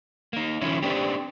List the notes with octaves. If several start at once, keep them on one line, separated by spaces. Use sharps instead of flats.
A#3 D#4
D#3 F3 C#4 E4
B3 C4 D4 G4